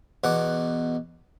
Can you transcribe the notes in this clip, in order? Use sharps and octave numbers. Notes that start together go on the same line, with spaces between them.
E2 B2 F#5 D6